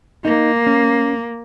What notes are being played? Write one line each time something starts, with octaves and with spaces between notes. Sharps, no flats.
A#3 D#4
C#4